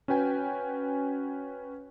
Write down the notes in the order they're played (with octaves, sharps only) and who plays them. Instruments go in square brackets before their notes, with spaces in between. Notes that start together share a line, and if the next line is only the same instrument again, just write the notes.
[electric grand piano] C#4 F#4 B4 G5 G#5